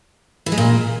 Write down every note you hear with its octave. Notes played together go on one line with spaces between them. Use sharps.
E3
G#3
A#2